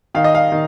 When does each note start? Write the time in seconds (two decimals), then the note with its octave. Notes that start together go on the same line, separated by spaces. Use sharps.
0.15 D#3 F5
0.24 D#5
0.35 F5
0.52 D#3